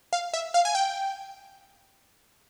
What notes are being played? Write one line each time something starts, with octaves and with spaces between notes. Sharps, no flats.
F5
E5
F5
G#5
G5